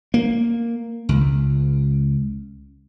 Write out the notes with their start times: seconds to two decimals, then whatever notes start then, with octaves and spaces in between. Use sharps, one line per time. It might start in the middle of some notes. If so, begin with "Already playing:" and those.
0.14 A#3
1.09 C#2